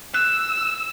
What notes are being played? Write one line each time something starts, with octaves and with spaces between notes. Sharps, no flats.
E6 F#6